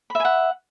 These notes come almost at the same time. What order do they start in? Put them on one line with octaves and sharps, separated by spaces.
B5 E5 G#5 F#5